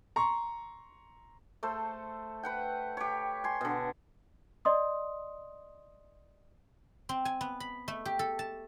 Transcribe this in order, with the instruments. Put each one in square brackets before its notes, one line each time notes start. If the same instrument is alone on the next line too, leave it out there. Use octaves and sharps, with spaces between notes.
[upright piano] A#5 C6 C#6
[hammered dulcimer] A3 A4 C5
B4 F#5 G5
G4 C#5
G#5 C6
B2 D3
[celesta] D5 D#5 C6 D#6
[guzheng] C4
G#5
B3
B5
A3
G4
A4
A5